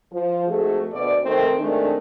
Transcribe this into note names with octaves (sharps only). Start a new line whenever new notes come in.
F3
F2 G#2 A3 F#4 G#4 A4
D2 B2 D5
D#3 A3 C4
D#3 G#3 A3 C4 D4